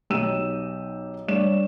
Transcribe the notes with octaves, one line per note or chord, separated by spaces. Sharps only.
B1 D#4 G4 E6 D#7 E7
G2 D4 C#5 D5 E7